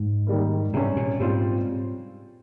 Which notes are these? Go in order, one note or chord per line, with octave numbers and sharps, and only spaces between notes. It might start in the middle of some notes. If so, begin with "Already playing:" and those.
Already playing: G#2
D#3 G3 A#3
G#2 C3 G3 C#4
A#2
G#2 G3 C4 F4